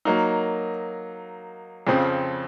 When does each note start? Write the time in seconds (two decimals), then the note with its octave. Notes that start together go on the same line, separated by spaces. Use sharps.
0.05 F#3 A#3 D#4
1.87 F2 C#3 F3 C4